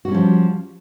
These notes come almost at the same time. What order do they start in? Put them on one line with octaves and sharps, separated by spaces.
F#4 G3 C#4 F3